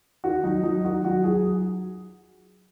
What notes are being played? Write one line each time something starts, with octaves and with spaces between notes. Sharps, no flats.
D#3 F#4
F#3 D#4
F#3 D#4
D#3 F#4
F#3 F#4
F#3 G#4